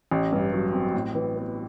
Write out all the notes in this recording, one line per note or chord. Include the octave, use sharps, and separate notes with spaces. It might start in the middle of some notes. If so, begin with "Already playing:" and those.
A1
G2
F#3
C4
A2
E3
B3